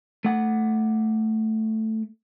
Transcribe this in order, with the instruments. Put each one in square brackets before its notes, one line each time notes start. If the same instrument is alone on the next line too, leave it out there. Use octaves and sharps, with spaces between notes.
[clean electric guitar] A3 F#5